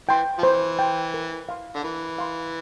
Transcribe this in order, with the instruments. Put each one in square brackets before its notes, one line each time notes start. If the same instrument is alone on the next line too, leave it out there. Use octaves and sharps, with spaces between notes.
[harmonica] E3 [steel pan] G5 C6
[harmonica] F3
[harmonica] E3 [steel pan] C5
[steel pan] G5 C6
A#4
F5 C6
[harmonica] D3
[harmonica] E3 [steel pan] A#4
[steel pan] F5 C6